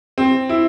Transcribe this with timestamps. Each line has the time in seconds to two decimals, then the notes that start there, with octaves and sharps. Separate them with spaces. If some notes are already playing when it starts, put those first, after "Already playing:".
0.18 C4
0.49 E4